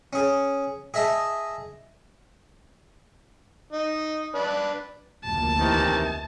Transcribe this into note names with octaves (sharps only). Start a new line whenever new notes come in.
C#4 G#4
G#4 D#5 E5 A5
D#4
D4 B4
F1 D2 A#3 A5
C3 D#3 E3